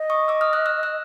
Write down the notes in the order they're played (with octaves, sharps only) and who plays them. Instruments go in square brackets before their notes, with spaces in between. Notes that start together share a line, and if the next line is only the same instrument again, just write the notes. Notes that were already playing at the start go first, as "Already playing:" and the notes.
Already playing: [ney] D#5
[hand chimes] C#6 D#6
D6 E6
D#6 F6
E6 F#6
E6 F#6
E6 F#6